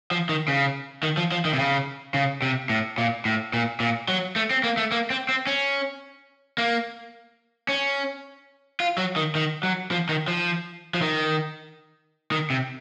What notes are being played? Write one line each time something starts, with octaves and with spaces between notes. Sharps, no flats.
F3
D#3
C#3
D#3
F3
F3
D#3
C3
C#3
C#3
C3
A2
A#2
A2
A#2
A#2
F#3
A3
C4
A#3
A3
A#3
C4
C4
C#4
A#3
C#4
F4
F#3
D#3
D#3
F#3
F3
D#3
F3
F3
D#3
D#3
C3